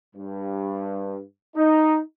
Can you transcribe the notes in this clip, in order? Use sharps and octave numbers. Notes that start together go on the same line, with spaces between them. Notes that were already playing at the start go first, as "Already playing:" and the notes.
G2
D#4